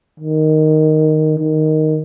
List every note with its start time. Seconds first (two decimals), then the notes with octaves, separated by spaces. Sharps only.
0.20 D#3
1.38 D#3